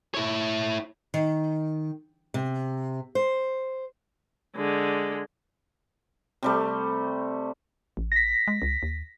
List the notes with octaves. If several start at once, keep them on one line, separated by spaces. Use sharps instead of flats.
E4 C#5
D#3
C3
C5
D3 G#3
C3 G3 A3
A1
A#6 B6
G#3
C#2
D#2